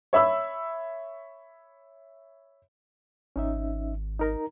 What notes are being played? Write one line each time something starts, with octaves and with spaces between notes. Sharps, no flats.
C#5 E5 B5 E6
G#1 C#4 D#4 E5
D#4 A#4 A#5